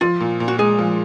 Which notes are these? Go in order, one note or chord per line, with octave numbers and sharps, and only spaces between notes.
F3 F4
A#2
A#2
F#4
G#3 G#4
F3